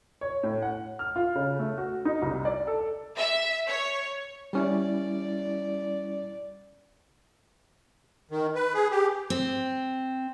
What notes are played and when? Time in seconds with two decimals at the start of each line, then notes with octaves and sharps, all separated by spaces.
0.21 C#5
0.43 A2
0.62 F#5
0.99 F6
1.16 F4
1.35 C#3
1.59 A3
1.78 F#4
2.05 D#4
2.22 C2
2.45 D5
2.67 A4
3.16 E5
3.66 C#5
4.53 G3 C#4 E4 D5
8.31 D#3
8.55 B4
8.74 G#4
8.91 G4
9.30 C4